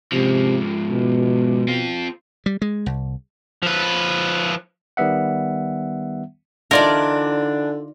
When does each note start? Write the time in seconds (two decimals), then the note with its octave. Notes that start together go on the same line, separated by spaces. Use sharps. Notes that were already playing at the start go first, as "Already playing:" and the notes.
0.12 G#2 C3 F3
0.90 B2
1.68 C4 F4
2.46 G3
2.62 G#3
2.86 C2
3.63 F3 B4
4.97 D#3 G3 B3 E5 F#5
6.71 D3 E3 D4 D#4 F4 A#4 D5